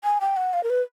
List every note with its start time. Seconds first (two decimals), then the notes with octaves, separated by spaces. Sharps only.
0.04 G#5
0.21 G5
0.37 F#5
0.53 F5
0.63 A#4
0.70 B4